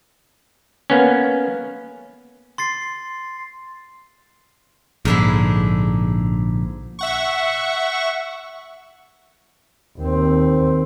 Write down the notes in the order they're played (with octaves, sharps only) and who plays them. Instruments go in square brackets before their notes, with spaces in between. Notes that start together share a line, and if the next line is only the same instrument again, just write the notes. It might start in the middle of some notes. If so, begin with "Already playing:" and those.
[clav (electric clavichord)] A#3 B3 C#4
[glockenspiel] C6 A6 C7
[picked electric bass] A#1 [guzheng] G#2 D3 E4
[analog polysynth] E5 F#5 C#6
[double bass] D#2 C4